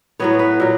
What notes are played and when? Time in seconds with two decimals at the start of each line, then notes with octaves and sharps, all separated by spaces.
0.20 A2 F#3 B3 C#5
0.39 B4
0.60 A#2 F#3